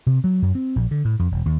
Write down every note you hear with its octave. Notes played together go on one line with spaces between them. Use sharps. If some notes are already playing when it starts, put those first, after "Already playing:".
C3
F#3
F#2
C4
A#1
D3
A2
F2
E1
D#2